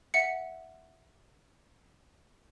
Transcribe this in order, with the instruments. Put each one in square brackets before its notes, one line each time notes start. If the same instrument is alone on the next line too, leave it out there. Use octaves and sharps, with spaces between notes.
[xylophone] E5 F#5 C#7